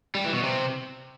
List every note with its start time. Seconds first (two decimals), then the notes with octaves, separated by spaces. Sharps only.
0.15 G3
0.24 E3
0.34 B2
0.43 C3